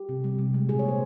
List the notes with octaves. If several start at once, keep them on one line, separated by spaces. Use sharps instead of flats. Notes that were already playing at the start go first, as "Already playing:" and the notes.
Already playing: G4
C3
G3
C3
G#3
A#2 G#4
C#5
A#3 C5